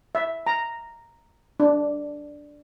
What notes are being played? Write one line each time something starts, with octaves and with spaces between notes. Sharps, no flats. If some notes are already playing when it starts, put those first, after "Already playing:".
E5
A#5
D4